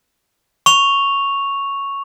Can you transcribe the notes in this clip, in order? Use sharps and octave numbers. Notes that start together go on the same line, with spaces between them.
C#6 F7